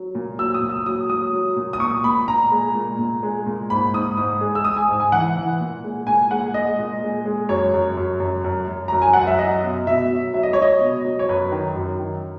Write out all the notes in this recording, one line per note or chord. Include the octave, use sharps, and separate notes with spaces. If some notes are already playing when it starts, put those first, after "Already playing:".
Already playing: F#3
A#2
F#3 E6
D#6
A#2
E6
F#3 D#6
F#3 D#6
F#3
A#2
D#6
A#2 C#6
A#2 B5
A#2 A#5
G#3
A#2
A#2
G#3
A#2
G#2 B5
G#2 D#6
G#2 D#6
G#3
E6
G#3 D#6
G#5
G#2
G#5
E3 F#5
E3
A#2
G#3
A#2 G#5
G#3 F#5
G#3 D#5
A#2
G#3
G#3
F#2 C#5
F#2
F#2
F#2
F#2
F#2
F#2 A#5
G#5
F#2 F#5
E5
F#3 D#5
B2
B2 E5
F#3
F#3 E5
D#5
C#5
F#3 D#5
B2
F#3
C#5
F#2 B4
D#3
F#2
D#3